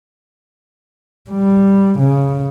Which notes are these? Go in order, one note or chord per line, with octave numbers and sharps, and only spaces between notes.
G3
C#3